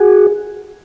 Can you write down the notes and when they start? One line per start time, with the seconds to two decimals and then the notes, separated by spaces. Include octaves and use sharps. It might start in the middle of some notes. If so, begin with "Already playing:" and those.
Already playing: F#4 G#4